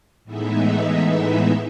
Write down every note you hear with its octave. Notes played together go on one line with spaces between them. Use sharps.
A2 E3 G#3 B3 D#4 E5